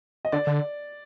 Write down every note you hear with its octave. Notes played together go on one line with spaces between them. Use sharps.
D#5
D3 D5
D3